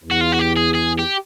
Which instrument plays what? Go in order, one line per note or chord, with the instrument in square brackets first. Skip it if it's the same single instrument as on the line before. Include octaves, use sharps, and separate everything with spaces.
[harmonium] E2
[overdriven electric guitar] F#4
F4
F#4
G4
G#4
G#4
G4